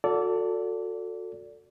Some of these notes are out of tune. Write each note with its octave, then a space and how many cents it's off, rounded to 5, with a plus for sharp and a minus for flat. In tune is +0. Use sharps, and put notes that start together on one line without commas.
F#4 -30 A4 +20 D5 -25